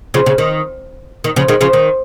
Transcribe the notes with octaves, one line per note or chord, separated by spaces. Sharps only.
C#3 F3
C#3
D#3
D#3
C#3 F3
D#3 G#3
C#3 F3
D#3